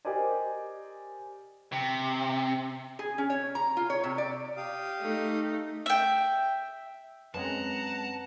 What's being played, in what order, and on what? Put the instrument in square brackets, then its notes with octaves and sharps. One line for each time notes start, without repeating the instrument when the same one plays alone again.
[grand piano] G4 A#4 C5 D5 D#5 G#5
[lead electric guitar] C3
[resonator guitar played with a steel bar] G#4
C#4
C#5
A#5
F4
C#5
C3
D5
[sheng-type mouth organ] G4 F5 D#6
[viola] A3 D#4
[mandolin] E5 G5
[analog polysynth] F#2 G#3 [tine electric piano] C4 C#4 B4 [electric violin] F#5 A#5 [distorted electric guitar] A5